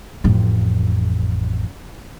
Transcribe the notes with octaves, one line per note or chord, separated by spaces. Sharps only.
A1 F2